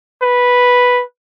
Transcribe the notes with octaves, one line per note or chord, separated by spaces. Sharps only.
B4